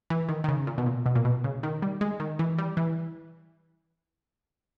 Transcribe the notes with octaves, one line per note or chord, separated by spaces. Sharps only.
E3
D#3
D#3
C#3
A#2
B2
A#2
B2
A#2
B2
C#3
D#3
G3
G#3
D#3
E3
G3
E3